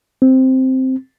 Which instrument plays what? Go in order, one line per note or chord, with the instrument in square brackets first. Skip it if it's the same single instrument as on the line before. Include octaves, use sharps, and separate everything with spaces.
[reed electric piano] C4